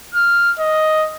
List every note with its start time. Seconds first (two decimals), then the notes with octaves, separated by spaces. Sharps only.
0.15 F6
0.59 D#5